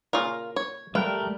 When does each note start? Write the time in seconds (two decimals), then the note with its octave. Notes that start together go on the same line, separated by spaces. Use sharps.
0.13 A#2 C#3 F4 A#4
0.56 C#5
0.95 G3 A3 A#4 B4 F5 G5